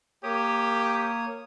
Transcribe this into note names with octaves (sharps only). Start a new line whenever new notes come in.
A#3 G4 C#5 D#6